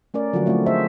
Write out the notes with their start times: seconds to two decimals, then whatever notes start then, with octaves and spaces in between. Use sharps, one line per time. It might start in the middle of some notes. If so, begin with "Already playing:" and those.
0.14 A3 C#4 A#4 D5
0.33 D3 F3 F#3 A#3 F#4 F#5
0.46 F#3 A3 C4 E4 F4
0.66 D4 G#4 A4 C5 D#5 E5